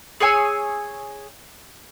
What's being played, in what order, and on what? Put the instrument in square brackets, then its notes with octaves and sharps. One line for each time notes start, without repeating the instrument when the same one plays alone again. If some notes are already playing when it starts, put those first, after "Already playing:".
[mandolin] G#4 C#5 G#5 E6